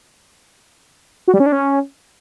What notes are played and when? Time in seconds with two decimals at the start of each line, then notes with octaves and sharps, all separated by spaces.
1.28 F#4
1.34 G3
1.40 C#4
1.46 D4
1.52 C#4